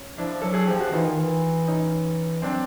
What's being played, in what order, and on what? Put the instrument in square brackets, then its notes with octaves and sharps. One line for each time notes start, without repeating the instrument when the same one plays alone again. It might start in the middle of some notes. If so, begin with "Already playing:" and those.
Already playing: [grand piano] C#4
[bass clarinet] F3 [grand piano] D4 E4
[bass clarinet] F#3 [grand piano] A4
[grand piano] G#4
[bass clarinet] F3 [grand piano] G4
[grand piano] F#4
[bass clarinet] E3 [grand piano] D#4 F4
[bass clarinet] D#3
E3
[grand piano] C#4 D#4
[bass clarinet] F#3 [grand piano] C4 D4